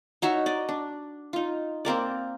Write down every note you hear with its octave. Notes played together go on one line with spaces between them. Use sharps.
D#4 F#4 C#5 E5
D5 D#5
D4
D#4 F4
A#3 C4 A#4 D5